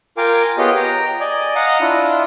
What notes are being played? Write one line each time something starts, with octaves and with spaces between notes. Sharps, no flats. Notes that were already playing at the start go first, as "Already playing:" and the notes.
F4 A#4 F5 G5 G#5 D6
B3 F4 G4 G#4 C#5 D#5
G5 A#5
D5 D#5 G#5
D#5 F5 F#5 A#5 D#6 F6
D4 E4 F4